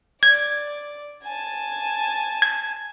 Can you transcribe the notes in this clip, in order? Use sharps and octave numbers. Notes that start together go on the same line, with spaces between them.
D5 G#6
G#5 A5
G#6